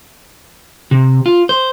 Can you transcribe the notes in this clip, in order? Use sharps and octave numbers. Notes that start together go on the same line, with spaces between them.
C3
F4
C5